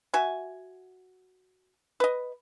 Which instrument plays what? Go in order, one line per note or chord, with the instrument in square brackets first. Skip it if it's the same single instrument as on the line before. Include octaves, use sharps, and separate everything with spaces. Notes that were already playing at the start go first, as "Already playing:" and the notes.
[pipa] F#4 E5 G#5
B4 D#5